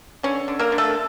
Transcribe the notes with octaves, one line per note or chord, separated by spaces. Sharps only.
D3 C#4
D3
A#3 A#4
D3
A3 A4